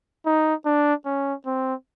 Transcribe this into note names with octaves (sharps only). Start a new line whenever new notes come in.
D#4
D4
C#4
C4